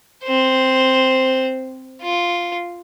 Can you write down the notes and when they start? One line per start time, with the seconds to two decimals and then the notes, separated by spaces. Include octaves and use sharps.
0.24 C4 C5
2.02 F4